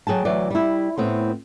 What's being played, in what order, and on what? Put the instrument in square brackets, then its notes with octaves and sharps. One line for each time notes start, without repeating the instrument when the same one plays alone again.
[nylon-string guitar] F#3 G#4 G5 A5
D2 E3 F#3 D5
G3 E4
A2 B3 C4